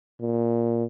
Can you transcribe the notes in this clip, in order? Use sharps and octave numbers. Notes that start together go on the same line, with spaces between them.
A#2